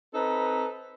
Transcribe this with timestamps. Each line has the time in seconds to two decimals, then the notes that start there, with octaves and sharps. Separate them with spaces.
0.15 C4 D#4 A4 B4 A#5